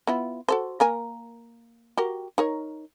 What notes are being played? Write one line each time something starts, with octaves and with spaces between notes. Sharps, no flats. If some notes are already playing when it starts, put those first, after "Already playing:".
B3 E4 F4
F#4 A4 C5
A#3 A#4 G#5
F#4 G4 A#4
D#4 A#4 C#5